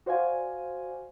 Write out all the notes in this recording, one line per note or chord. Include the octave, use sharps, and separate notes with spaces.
F#4 C5 D5 F5 G#5